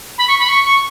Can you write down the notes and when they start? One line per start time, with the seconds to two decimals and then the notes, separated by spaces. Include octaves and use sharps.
0.18 B5
0.28 C#6
0.39 B5
0.48 C#6
0.64 C#6